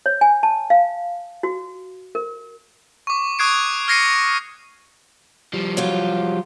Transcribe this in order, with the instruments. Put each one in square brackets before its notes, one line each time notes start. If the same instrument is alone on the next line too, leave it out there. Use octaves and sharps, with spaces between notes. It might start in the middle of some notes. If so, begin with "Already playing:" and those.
[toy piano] C#5
G#5
A5
F5
F#4
A#4
[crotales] C#6 D6
C#6 D#6 F#6 G#6 C7 D7
F6 G#6 A#6 C7 C#7 D#7
[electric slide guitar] F3 G3
[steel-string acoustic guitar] F#3 F4 G4